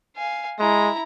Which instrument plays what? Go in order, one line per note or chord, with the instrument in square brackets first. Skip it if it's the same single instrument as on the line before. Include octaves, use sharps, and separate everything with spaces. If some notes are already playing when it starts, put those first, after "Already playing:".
[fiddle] F5 G#5
[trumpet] G#3 [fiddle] E4 A#5